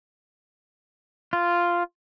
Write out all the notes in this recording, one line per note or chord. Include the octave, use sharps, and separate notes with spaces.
F4